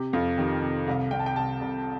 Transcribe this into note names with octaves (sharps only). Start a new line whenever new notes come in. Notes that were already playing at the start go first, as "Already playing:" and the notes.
Already playing: C3 G4
F2 F4
D#3 G4
C3
C2 F5
C2 G5
A5
G5
C2 A5
C2